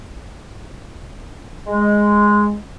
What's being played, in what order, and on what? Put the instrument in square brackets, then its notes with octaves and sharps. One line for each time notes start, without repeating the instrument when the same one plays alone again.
[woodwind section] G#3